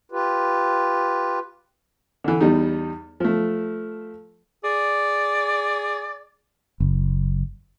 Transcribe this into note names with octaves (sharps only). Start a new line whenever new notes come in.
F4 G4 B4
D3 E3
E2 G3 D#4
F3 A3
G#4 D5
F#1